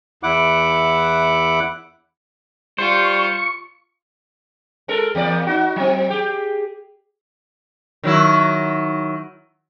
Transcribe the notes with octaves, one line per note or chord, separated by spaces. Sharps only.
E2 E4 F#5 D6
G3 F4 C5 C#6
G#3 A4 A#4
E2 A#3 D5
D#4 F#4
F#3 C4
G4 G#4
D#3 F#3 E4